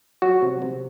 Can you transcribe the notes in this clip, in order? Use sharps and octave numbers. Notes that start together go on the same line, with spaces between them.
F#3 F#4
C3
C3